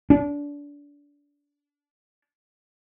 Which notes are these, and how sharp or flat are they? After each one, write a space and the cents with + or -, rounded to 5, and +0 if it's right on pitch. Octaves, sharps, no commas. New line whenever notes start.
D4 -25